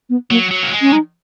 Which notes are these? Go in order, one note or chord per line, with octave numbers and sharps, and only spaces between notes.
B3
F#3 A#3
F#3
A#3
G#3
C#4
D#4